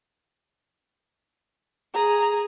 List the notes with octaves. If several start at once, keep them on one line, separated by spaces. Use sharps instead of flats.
G#4 A#5